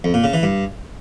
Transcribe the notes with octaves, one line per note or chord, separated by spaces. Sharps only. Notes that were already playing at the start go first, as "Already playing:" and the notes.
F2
A#2
C#3
E3
G2